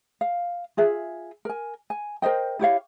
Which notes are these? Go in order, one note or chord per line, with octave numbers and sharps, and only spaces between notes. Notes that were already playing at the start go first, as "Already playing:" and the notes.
F5
F4 G#4 E5
A#4 G#5
G#5
A#4 C5 D#5 G5
E4 G4 C#5 F5